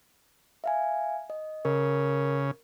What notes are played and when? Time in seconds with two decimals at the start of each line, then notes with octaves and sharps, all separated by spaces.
0.64 E5 F5 G#5
1.30 D#5
1.65 C#3 A#4